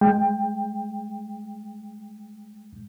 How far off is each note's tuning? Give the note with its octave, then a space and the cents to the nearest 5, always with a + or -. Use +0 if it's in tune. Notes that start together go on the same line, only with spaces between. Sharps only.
G#3 +0 G5 +15